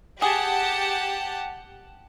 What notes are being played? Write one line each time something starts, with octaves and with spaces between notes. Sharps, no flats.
G4 G#4 F#5 A5